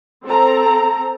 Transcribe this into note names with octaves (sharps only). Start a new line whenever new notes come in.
C4 A4 A#5